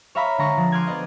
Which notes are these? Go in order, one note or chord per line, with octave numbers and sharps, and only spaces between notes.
C#5 E5 F5 A#5 B5
D3 G#3 A#5 C#6 A#6
F3
C6 D6 D#6 F6 F#6 G#6
B3 D5 D#5